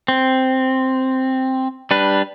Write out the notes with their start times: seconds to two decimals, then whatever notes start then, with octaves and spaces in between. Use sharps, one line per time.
0.08 C4
1.91 G3 D4 B4